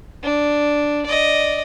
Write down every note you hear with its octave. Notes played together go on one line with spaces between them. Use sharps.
D4
D5 D#5